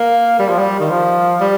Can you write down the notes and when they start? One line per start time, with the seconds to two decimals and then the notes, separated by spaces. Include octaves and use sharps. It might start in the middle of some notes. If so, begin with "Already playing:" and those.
Already playing: A#3
0.39 G3
0.49 F3
0.59 G3
0.80 D#3
0.90 F3
1.41 G3